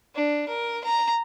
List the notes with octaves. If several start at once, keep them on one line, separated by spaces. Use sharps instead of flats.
D4
A#4
A#5